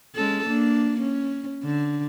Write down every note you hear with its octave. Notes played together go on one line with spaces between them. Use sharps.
G#3 C#4 A4
A#3 D4
C#4
D3